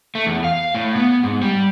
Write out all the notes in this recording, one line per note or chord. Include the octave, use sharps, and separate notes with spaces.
A3
E2
F5
A2
B3
G#2
G3